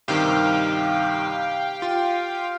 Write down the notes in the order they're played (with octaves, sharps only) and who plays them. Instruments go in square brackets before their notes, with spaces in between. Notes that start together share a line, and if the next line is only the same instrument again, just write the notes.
[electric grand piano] G2 C3 D#3 [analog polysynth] G4 F5 G5
[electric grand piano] F4